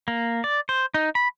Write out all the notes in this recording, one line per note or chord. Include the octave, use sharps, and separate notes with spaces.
A#3
D5
C5
D#4
B5